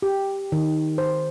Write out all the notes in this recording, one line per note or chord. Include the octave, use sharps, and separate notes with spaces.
G4
D#3
C5